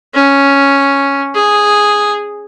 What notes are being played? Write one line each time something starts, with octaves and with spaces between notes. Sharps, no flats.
C#4
G#4